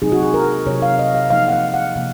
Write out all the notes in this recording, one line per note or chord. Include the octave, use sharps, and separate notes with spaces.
C3 F#3 C4 D#4 G#4
F#4
G#4
A#4
C3 F#3 C4 D#4 C#5
F5
D#5
F5
C3 F3 A#3 D#4 F5
F#5
F5
F#5
C3 F3 A#3